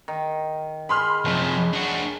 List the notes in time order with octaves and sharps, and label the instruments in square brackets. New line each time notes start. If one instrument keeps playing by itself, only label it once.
[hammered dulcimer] D#3
[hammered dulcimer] G#4 [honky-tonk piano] B5 C6 F6
[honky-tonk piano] F#1 [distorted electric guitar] C3 F3
[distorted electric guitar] D4 F#4